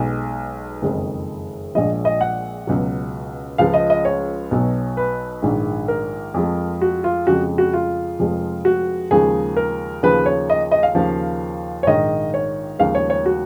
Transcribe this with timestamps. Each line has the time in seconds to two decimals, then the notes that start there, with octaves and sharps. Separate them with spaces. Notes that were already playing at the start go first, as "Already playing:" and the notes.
Already playing: B1 B2 G#3
0.82 F#1 F2 D#3 G#3
1.75 A#1 A#2 F3 G#3 D#5
2.05 D#5
2.21 F#5
2.67 C#2 B2 F#3
3.58 C#2 C#3 F3 G#3 F5
3.74 D#5
3.90 D#5
4.05 C#5
4.51 B1 B2 F#3
4.97 B4
5.42 A#1 G#2 D#3
5.88 A#4
6.34 F2 F3 G#3
6.82 F#4
7.04 F4
7.27 F2 C#3 F3 G#3 F#4
7.58 F#4
7.74 F4
8.20 F1 F2 F3 G#3
8.65 F#4
9.11 D#2 C#3 F3 G#3 G#4
9.57 A#4
10.03 D#2 C#3 F3 B4
10.26 C#5
10.50 D#5
10.71 D#5
10.83 F5
10.95 D#2 C#3 F3
11.83 C#5
11.87 A#1 G#2 D#3 D#5
12.34 C#5
12.79 D#2 C#3 F3 G#3 F5
12.95 C#5
13.10 C#5
13.26 F#4